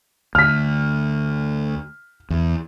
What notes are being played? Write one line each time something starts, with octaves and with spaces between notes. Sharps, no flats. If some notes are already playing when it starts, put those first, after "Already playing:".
D2 F6 B6
E2